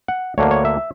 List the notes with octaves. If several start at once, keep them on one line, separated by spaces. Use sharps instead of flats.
F#5
D2 D3 A#3 C#5
C#5
E5